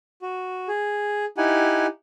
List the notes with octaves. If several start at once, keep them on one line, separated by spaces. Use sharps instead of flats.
F#4
G#4
D#4 E4 G4 F#5 G#5